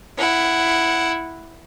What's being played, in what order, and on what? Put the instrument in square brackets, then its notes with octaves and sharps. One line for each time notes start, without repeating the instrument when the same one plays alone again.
[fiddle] E4 F#5